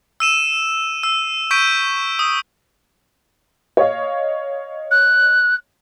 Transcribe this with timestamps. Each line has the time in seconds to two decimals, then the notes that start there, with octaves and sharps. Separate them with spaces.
0.20 E6 D#7 E7
1.03 E6
1.51 C#6 G6 B6 D7 D#7
2.19 D#6
3.77 C#5 D#5 F5
4.91 F#6